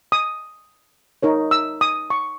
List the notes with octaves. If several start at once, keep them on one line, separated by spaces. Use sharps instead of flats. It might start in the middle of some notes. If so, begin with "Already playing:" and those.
D#6
D#4 A#4 C#5
E6
D#6
C#6